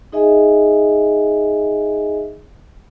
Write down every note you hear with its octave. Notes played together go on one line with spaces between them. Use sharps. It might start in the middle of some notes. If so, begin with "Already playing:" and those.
D#4 G#4 D#5 E5 G#5